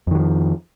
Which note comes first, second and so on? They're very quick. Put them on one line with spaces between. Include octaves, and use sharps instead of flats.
F2 D#3 F#3 F3